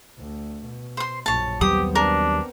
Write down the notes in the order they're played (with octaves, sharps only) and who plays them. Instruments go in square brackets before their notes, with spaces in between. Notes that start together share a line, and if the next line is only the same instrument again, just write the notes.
[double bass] D2
B2
[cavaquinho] C5 C6
[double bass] A#1 F#2 [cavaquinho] C#5 A5
[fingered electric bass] D#2 F#3 G3 [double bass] B3 C4 [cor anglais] G4 [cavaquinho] D#6
[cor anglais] D4 [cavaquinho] A#4